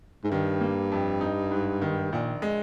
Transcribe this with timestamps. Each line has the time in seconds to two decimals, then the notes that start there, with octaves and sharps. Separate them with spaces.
0.24 G#2
0.30 G2 D#3
0.61 A#3
0.92 F2
1.21 D#4
1.51 G#2
1.82 D#3
2.12 A#1 A#2
2.42 G#3